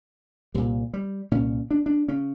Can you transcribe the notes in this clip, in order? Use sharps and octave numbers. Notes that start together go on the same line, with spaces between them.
C2 A#2 G3
G3
C2 A#2 C#4
D4
D4
C#3 C#4